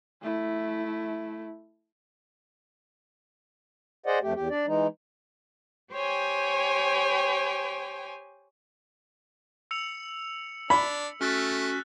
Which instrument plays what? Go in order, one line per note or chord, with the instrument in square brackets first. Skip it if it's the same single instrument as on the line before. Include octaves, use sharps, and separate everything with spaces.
[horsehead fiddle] A3 E4
[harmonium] G#4 C5 D5 D#5 F#5
F2 A3 G4
E2 G4
D4 D5
E3 G#3 D#4
[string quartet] G4 C5 C#5 G5 G#5
[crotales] E6 C#7 F7
[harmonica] D4 [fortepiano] B5
[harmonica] A3 [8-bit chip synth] C#4 F#4 B6 [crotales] F6 F#6 A6